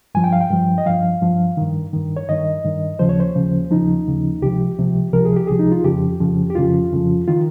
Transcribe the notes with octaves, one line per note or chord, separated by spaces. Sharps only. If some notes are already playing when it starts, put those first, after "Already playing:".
G2 F3 G#5
G5
F5
G5
G2 F3
D#5
G2 F3 F5
G2 F3
G2 D#3
G2 D#3
C#5
G2 D#3 D#5
G2 D#3
D#2 C#3 F3 C5
C#5
C5
D#2 C#3 F3
D#2 C#3 F3 D#4
D#2 C#3 F3
C#2 C3 F3 G4
C#2 C3 F3
C#2 C3 F3 A#4
G#4
G4
C#2 C3 F3 G#4
D#4
F4
F2 C#3 F3 G4
F2 C#3 F3
G4
F2 C#3 F3 F4
F2 C#3 F3
D#3 F4